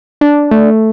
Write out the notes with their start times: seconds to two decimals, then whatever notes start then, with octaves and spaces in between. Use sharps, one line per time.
0.21 D4
0.51 A3